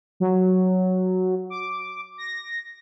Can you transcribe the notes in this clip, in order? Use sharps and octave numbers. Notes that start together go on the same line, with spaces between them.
F#3
D6
A#6